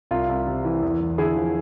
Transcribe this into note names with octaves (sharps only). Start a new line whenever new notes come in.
C2 F4
C2
C3
E3
E2
E2
D3 E4 G#4
F3